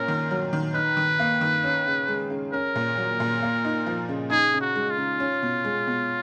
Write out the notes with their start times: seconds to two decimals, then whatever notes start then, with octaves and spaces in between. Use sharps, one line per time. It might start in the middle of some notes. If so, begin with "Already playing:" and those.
Already playing: A#2 C#4 A#4
0.08 D#3
0.31 F#3
0.53 D#3
0.74 D#4 B4
0.97 D#3
1.20 A#3
1.41 D#3
1.64 C#4
1.86 C#3
2.08 G#3
2.30 C#3
2.53 C#4 A#4
2.76 A#2
2.97 F#3
3.20 A#2
3.43 A#3
3.65 D#4
3.86 F3
4.09 C#3
4.30 D#4 G#4
4.54 C#3
4.61 F#4
4.76 G#3
4.90 F4
4.98 C#3
5.20 C#4
5.43 B2
5.65 G#3
5.87 B2